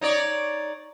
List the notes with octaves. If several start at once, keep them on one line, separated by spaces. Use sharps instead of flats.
D#4 C#5 D5